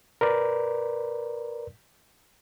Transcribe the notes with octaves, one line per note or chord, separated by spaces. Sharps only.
A#4 B4 D5